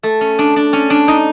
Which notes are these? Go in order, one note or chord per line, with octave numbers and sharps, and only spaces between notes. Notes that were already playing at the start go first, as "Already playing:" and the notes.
A3
C#4
D4
D4
C#4
D4
D#4